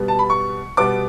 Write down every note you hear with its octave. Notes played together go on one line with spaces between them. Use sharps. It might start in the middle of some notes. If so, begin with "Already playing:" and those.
Already playing: B2 G3 B3
A5
B5
C#6
B2 G3 B3 D6